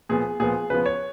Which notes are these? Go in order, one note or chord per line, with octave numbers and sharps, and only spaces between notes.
A#2 F3 B3 G#4
A#2 F3 B3 G#4
C#3 F3 B3 B4
C#5